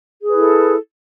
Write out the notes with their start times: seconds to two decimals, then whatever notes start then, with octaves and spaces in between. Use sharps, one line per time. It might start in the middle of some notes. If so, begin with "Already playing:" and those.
0.23 G#4
0.28 B4
0.33 E4
0.38 A4